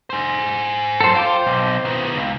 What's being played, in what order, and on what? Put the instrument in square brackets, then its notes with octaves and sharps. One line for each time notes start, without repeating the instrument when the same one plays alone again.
[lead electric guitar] G#4 C5
[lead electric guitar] F#2 [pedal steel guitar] A4 C5
[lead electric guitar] F4 [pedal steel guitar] C5 G5 D6
[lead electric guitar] B1
D#3 B3
C#2